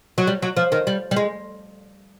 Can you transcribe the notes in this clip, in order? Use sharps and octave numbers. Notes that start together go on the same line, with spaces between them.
F#3
G3
F#3
F3
D#3
G3
G3
G#3